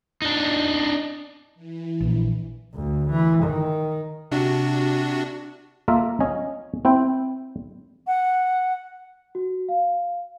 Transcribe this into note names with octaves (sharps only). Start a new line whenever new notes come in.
D4 D#4
E3
A#1
D2
E3
D#3
C3 D4 F#4
A#3 F4 A4 A#4 E5
C#4 D#5 G#5
C4 E4 G5
F#5
F#4
F5